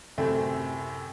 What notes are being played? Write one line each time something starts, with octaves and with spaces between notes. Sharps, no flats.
F#2 A2 C3 A3 C4